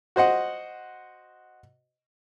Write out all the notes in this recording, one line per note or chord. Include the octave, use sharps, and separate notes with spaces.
F#4 C5 D#5 F#5